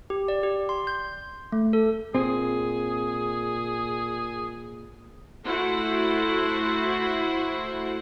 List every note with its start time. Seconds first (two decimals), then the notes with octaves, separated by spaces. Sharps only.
0.10 G4
0.28 D5
0.43 G4
0.69 C6
0.87 G6
1.52 A3
1.73 A4
2.15 A#2 C4 G#4
5.45 A3 E4 F#4 C5 F#5